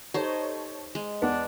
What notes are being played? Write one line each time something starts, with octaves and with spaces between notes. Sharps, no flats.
D#4 G4 A4 C5 C#5
G#3
E2 B3 D4 F#5